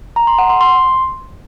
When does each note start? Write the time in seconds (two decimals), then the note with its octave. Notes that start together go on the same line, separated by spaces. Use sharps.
0.16 A#5
0.27 C6
0.38 F#5
0.50 C6
0.61 C6